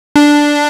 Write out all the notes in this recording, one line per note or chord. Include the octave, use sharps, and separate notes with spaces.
D4